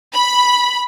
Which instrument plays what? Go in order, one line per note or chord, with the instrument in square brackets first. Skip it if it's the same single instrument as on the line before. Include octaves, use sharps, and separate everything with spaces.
[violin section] B5